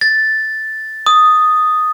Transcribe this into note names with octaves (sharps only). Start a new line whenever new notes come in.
A6
D#6